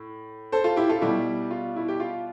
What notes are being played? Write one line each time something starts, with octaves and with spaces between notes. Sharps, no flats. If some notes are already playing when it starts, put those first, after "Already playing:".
Already playing: A2
A4 C5
F4
E4 G4
F4 A4
B2 G3 E4 G4
F4
E4
G4
F4